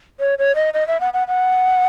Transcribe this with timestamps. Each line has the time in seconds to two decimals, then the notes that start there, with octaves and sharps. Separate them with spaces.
0.20 C#5
0.39 C#5
0.55 D#5
0.74 D#5
0.88 E5
1.01 F#5
1.14 F#5
1.28 F#5